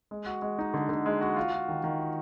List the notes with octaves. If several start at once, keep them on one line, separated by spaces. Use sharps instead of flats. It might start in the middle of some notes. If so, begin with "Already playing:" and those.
G#3
F#4
G#3
D#4
D3
D3
G#3
F#4
F4
F4
D#3
D#3
F4